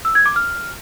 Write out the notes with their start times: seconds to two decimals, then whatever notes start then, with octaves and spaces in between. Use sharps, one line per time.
0.05 E6
0.15 G#6
0.26 D6
0.36 F6